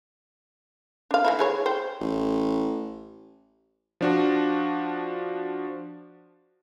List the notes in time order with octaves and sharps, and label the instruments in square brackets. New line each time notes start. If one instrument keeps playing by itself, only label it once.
[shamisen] D4 F5
E3 A#3 E4
E3 G#4 C#5
C5 G5
[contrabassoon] A1
[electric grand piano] F3 D4 F#4